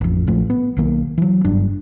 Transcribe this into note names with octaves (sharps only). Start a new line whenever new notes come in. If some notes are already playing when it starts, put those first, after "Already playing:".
A1 F2
A#1 A2 F3 A3
B3
B1 D#3 A#3
E3 F#3
F#1 G2 D4